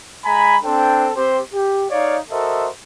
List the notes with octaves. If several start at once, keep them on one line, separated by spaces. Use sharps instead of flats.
G#3 G#5 A#5 B5
C4 D4 A4 C5 G5
C4 G4 C5
G4
D#4 C#5 D5 F5
F#4 A4 A#4 C5 D#5 E5